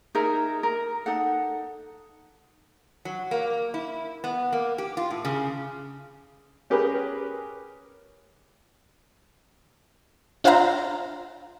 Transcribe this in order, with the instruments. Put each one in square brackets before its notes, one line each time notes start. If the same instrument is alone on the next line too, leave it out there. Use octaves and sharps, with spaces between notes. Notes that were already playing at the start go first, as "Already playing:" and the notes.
[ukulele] D#4 G#4 A#4 E5
A#4
D#4 A4 F#5
[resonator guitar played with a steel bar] F#3
A#3
E4
B3
A#3
G4
F4
A2
C#3
[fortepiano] C#4 G4 G#4 A#4 B4
[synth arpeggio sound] D4 F4 C5 E5 F5 A#5